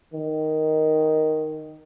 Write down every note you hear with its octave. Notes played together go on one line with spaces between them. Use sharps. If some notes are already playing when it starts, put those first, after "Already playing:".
D#3